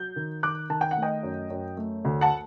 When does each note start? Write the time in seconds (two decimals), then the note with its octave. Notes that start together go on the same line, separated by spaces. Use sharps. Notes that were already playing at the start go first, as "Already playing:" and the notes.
Already playing: F#3 G6
0.16 D#3
0.43 D#3 D6 F#6
0.70 D#3 A5
0.81 G5
0.91 F#5
0.97 A3
1.02 D#5 G5
1.23 F#2
1.50 F#2
1.77 A3
2.05 D2
2.21 F#5 A5